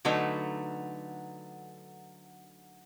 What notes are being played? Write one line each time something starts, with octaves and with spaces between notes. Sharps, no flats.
D3 F#3 A3 D#4 B4